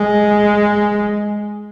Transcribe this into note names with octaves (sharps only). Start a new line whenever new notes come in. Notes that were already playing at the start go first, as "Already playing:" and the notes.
Already playing: G#3